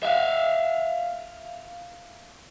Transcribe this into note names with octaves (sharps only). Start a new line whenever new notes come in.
E5 F5